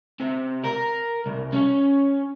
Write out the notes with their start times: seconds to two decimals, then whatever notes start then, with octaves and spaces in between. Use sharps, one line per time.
0.20 C3
0.64 A#4
1.26 C2
1.52 C#4